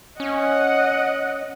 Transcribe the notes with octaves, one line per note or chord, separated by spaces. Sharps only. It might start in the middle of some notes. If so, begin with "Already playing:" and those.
C#4 D#5 F#5